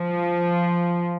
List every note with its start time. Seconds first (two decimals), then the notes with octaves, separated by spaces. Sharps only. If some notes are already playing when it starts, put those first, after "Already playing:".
Already playing: F3